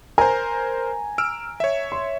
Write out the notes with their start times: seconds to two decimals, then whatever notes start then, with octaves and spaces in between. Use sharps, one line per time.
0.18 A#4 C5 G#5 A#5
1.18 E6 F6 D7
1.60 C#5 E5
1.92 C6